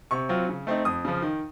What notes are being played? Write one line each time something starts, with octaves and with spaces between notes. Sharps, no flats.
C3 C#6
F#3 C4 F4
C#3
A3 C4 D#4
F2 D#6
C#3 F3
D#3